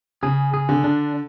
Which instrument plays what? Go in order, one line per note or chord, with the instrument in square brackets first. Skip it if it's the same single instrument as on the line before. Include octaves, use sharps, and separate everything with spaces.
[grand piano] C#3 [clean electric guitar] G#4
[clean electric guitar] G#4
[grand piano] D3
[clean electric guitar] D4